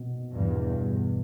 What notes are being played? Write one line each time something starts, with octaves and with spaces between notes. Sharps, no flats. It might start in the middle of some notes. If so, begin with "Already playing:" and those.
Already playing: B2
E2 G2